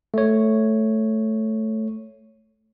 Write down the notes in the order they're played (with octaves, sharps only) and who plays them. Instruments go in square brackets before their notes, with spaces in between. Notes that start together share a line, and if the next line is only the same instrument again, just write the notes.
[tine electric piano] A3 C#5